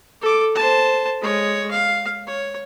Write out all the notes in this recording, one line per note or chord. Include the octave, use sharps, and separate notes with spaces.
A4 D6
C5 A5
G#3 C#5
F5
C#5